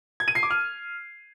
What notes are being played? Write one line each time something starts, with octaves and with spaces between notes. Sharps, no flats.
G#6
D#7
C7
D6
F6